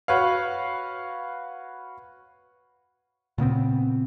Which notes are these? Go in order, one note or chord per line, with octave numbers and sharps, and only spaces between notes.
F#4 B4 C#5 F5
A#2 C#3 B3 C4